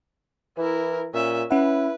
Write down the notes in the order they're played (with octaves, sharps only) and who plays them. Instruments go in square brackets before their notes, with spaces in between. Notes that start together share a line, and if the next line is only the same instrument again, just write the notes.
[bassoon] E3 [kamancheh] E4 A#4
[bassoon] A#2 [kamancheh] C#4 E5
[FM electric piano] C#4 F#5 [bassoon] E4 [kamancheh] B4